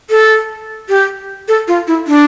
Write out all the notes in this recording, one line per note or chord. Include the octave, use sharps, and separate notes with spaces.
A4
G4
A4
F4
E4
D4